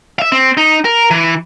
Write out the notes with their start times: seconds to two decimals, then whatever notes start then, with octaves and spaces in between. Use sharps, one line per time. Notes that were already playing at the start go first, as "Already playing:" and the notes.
0.19 E5 F5
0.32 C4
0.57 D#4
0.85 A#4
1.11 E3